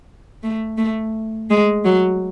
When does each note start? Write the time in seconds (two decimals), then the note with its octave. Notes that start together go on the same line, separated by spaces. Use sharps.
0.43 A3
0.78 A3
1.50 G#3
1.85 F#3